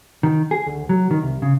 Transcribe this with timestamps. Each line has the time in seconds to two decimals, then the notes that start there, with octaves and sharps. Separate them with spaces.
0.23 D#3
0.51 G#4
0.66 D2
0.89 F#3
1.11 D#3
1.22 C2
1.42 C#3